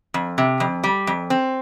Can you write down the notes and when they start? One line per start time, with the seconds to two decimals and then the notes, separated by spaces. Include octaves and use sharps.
0.14 F2
0.38 C3
0.60 F2
0.84 G3
1.07 F2
1.30 C4